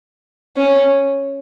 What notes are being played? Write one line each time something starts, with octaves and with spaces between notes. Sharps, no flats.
C#4